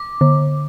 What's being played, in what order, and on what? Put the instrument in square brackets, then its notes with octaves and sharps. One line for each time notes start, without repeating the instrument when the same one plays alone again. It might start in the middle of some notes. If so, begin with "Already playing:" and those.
Already playing: [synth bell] D6
D3